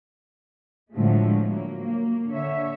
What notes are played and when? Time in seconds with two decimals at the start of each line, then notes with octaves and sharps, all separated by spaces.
0.94 A2 D3 F3 F#3 G#3 A3
1.45 F#3 A#3
1.83 A#3
2.29 D3 C#5 E5